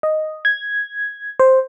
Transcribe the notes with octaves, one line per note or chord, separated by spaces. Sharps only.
D#5
G#6
C5